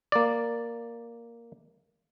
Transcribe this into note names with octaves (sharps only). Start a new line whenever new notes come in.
A#3 D5